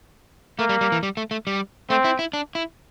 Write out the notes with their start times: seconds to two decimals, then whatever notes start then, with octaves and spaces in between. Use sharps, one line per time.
0.59 A3 A#3
0.69 G3
0.81 G3
0.92 E3
1.03 G3
1.17 A3
1.31 A3
1.47 G3
1.90 A3 C4
2.04 E4
2.19 E4
2.33 D4
2.55 E4